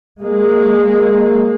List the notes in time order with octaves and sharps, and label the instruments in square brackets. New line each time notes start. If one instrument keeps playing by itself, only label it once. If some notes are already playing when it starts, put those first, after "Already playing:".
[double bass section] G#3 A#3